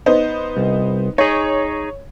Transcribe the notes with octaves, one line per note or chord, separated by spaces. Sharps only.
B3 D#4 C5
C2
D#4 G#4 C#5